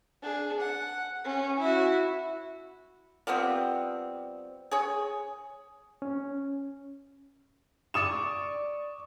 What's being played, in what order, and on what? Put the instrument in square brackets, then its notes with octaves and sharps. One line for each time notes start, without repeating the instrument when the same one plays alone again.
[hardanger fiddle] D4 G#4
F#5
C#4
E4 F#4
[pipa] F3 G3 B3 C4
G#4 C#5
[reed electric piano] C#4
[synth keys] D5 C#6 [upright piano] D#6 E7